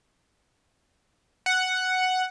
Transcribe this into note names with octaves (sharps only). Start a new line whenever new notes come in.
F#5